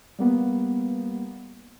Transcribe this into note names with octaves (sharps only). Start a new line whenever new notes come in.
G3 A#3 B3